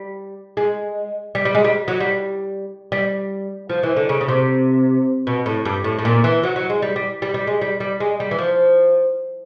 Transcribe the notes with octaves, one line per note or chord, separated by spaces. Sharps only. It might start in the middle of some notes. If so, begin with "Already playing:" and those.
Already playing: G3
G#3
G3
G3
G#3
G3
F#3
G3
G3
F3
E3
D3
C#3
C#3
C3
B2
A2
G2
A2
A2
A#2
E3
F#3
F#3
G#3
G3
G3
G3
G3
G#3
G3
G3
G#3
G3
E3
F3